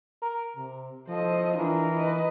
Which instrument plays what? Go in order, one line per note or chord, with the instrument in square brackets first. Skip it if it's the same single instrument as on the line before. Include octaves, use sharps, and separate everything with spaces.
[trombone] A#4
C3
[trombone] F3 [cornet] A4 [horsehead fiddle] C5 D#5
[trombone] E3 [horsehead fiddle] D4 F4 [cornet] A#4
[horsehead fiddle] B4 D#5